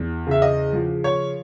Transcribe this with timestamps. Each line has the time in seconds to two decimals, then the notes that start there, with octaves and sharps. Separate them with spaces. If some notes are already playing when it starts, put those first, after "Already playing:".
Already playing: E2
0.27 C#3 E5
0.42 D#5
0.73 F3
1.04 C#5